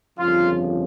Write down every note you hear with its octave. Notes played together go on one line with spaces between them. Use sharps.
G1 F2 C#3 F3 F4